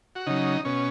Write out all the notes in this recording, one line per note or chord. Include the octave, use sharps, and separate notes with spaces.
F#4
C#3 F#3 D#4
B2 C#4